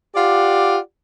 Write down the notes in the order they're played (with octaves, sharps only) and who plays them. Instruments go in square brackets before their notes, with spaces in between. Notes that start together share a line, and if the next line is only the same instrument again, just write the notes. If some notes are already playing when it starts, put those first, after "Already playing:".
[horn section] F4 G4 D5 F#5